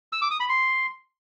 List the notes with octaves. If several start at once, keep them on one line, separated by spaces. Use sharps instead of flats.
E6
D6
D#6
B5
C6